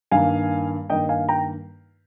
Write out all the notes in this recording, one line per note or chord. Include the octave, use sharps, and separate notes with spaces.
G2 D#3 A#3 F5 G#5
G2 D#3 A#3 D#5 G5
F5 G#5
G5 A#5